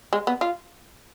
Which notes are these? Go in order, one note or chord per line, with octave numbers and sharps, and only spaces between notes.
G#3
B3
F4